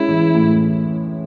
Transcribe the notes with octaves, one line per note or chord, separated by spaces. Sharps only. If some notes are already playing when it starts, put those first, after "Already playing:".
Already playing: G#3 C#4 E4
E3
A2